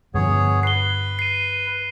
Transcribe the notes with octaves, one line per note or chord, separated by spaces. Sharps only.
G2 D3 F3 B3 G#4 C#5
B4 C7 G7
C7 D#7